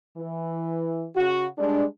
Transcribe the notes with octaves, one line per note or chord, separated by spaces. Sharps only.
E3
C#3 F#4
G3 G#3 D4